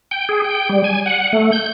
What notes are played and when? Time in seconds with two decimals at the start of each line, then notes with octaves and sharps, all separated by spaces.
0.11 G5
0.29 G#4
0.44 G5
0.69 G3
0.84 G#5
1.06 F#5
1.33 A3
1.52 G6